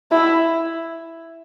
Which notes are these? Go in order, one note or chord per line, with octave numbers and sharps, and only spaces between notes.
E4